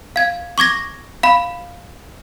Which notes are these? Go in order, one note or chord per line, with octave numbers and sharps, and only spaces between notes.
F5 G#6
C#6 D6 G#6 A#6
F5 B5